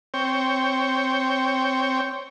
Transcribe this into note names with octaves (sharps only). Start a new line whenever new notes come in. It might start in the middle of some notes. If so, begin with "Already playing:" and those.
C4 C#5 G5